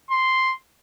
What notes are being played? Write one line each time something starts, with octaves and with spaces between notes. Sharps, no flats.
C6